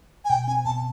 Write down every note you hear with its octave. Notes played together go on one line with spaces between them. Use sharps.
G#5
B2 G5
C4 G#5
B2 A5